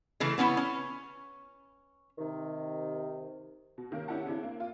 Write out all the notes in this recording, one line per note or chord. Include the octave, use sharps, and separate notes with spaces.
C#3 E3 A3
B3 C#4 D#4 E4
C#4
C3 D#3
B2
C3 D#3 A#3 C#4 A#4
C#4 D4 E4 G4 F#5 A5
C#3 C4 D4 E4
A#3
F4